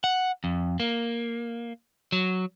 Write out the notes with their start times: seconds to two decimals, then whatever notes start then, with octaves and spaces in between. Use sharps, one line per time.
0.04 F#5
0.44 F2
0.80 A#3
2.12 F#3